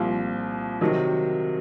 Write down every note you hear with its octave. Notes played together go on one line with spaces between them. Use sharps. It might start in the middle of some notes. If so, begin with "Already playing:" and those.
Already playing: C2 A#2 F3
C3 D#3 F#3